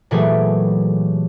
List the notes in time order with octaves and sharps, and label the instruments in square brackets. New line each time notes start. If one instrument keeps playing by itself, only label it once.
[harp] A#2 E3 F#3 A3 G4 G#4